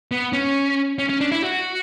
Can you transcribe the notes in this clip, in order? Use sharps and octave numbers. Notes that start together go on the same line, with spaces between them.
B3
C#4
C#4
C#4
D4
E4
F#4